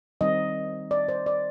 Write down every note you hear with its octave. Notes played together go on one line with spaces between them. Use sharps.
D#3 G3 C4 D#4 D#5
D5
C5
D5